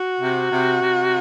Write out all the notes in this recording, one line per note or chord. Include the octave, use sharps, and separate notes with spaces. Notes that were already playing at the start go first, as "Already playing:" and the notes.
Already playing: F#4
C3
C3
C3